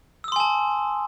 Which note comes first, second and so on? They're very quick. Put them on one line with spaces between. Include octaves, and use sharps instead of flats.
E6 D#6 C6 G#5 A5